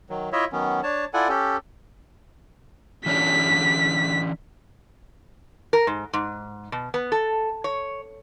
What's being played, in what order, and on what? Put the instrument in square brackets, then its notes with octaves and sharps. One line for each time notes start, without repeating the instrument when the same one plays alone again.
[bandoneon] D#3 F#3
E4 F4 C#5 D#5 E5
D#3 F#3 B3 C#4
D4 C#5 A5
E4 F4 A4 D5 F#5 G#5
C#4 G4 A4
[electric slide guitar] E3 C#4 D4 [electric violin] B6
[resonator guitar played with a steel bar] A#4
G#2
G#2
B2
B3
A4
C#5